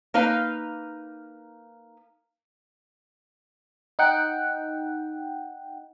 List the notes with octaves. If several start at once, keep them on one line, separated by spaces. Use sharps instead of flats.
A#3 D#4 B4 F5
D#4 F#5 G5